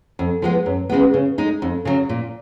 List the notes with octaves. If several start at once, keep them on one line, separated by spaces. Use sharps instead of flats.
F2
F3 G#3 B3
F#2
C#3 G#3 B3
C#3
G#3 D#4
F2
C#3 F#3
A#2